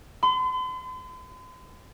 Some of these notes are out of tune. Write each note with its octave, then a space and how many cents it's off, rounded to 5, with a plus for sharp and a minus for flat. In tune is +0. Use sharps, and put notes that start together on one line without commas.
C6 -45